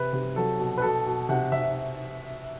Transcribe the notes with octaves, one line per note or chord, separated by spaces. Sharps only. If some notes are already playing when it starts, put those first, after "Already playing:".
Already playing: C3 B4
C3
F#3 A4
B2
B4
B2 A4
B2
C3 F#5
C3 E5